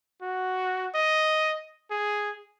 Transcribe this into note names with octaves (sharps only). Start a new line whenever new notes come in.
F#4
D#5
G#4